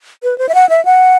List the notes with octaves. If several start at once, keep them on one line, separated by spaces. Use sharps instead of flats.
B4
C5
E5
F#5
E5
F#5